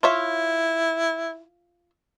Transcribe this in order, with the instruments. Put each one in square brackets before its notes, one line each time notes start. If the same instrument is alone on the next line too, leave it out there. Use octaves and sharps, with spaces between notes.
[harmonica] E4 [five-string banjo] F4 C#5 E5